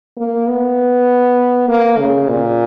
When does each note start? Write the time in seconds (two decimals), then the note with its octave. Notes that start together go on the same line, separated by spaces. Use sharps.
0.17 A#3
0.47 B3
1.68 A#3
1.98 C#3
2.28 A#2